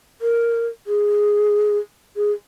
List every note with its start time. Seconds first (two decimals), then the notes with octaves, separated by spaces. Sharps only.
0.22 A#4
0.87 G#4
2.16 G#4